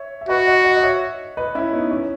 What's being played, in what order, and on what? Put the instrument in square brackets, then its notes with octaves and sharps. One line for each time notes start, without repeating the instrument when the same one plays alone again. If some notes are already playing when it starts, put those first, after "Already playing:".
Already playing: [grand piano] C#5 E5
E5
[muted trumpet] F#4 [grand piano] B4 D#5
[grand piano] D#5 F#5
D#5 F#5
D#5
C#5 E5
B4 D#5
C#4 E4
B3 D#4
C#4